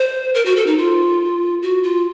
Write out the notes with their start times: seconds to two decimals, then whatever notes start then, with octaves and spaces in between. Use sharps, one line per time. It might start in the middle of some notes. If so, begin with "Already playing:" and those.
Already playing: C5
0.34 A#4
0.45 F#4
0.56 A4
0.67 D#4
0.78 F4
1.62 F#4
1.83 F4